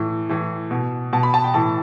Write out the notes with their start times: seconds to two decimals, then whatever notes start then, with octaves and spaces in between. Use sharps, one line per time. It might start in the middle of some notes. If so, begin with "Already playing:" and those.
Already playing: A2 E3
0.29 A2 E3
0.71 B2
1.13 B2 A5
1.23 B5
1.34 A5
1.44 G5
1.54 A2 E3 A5